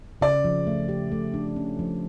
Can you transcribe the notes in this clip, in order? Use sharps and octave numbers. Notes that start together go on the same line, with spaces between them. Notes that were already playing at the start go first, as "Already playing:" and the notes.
C#3 D5
F3
A3
G4
A3
D4
C#4
F3